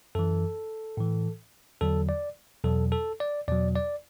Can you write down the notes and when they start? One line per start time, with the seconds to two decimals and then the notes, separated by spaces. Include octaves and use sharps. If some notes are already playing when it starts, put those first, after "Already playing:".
0.15 F#2 E3 A4
0.97 A2 E3
1.81 E2 D3 F#3 A4
2.09 D5
2.64 E2 B2 F#3 A4
2.92 A4
3.20 D5
3.48 E2 B2 F#3 D5
3.75 D5